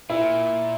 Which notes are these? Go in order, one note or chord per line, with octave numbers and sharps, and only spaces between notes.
A#2 E4